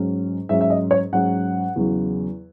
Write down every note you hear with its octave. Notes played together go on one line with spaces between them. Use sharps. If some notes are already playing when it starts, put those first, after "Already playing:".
Already playing: G#2 F#3 C#4
G#2 F#3 C#4 E5
E5
D#5
C#5
G#2 F#3 C#4 F#5
E2 C#3 F#3